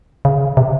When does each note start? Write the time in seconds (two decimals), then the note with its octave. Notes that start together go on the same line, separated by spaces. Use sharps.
0.25 C#3
0.57 C3